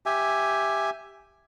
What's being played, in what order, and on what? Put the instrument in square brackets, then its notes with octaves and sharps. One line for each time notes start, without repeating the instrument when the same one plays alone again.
[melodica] G4 E5 G#5